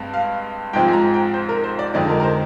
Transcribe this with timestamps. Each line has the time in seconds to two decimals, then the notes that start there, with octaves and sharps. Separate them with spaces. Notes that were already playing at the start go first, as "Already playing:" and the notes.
Already playing: G2 G#3 C4
0.14 F5
0.73 G#2 F3 G#3 C4 F4 G5
0.88 G#5
0.93 A#5
1.14 G5
1.34 C5
1.49 A#4
1.64 C5
1.79 D5
1.94 F2 D3 G#3 C4 D#4 D5
2.09 A#4
2.20 A#4
2.24 C5